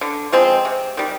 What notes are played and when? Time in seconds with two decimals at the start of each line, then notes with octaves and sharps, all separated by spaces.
0.01 D3
0.32 F3 G#3 C4
0.65 C3
0.97 D#3 G3